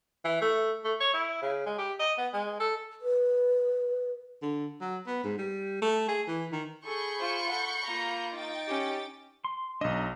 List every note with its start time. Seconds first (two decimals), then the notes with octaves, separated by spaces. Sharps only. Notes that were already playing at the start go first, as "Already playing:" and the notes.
0.25 E3
0.41 A3
0.84 A3
1.00 C#5
1.14 E4
1.42 C#3
1.66 G#3
1.78 G4
1.99 D#5
2.18 B3
2.34 G#3
2.60 A4
3.02 B4
4.42 D3
4.81 F#3
5.07 B3
5.24 G#2
5.38 G3
5.82 A3
6.08 G#4
6.28 E3
6.52 D#3
6.85 G#4 A4 B5 C#6 G6
7.19 F4 C5
7.49 A4 F#5
7.85 A#3 F4 A#5
8.34 D#4 G5 A6
8.68 C#4 G4
9.45 C6
9.81 B1 D4 D#5 E5 A#5